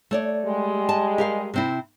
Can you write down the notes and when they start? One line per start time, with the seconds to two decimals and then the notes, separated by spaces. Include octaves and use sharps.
0.11 A3 C#5 D5
0.45 G3 G#3
0.89 A5
1.18 G4 A#4 F5
1.54 C3 C4 E4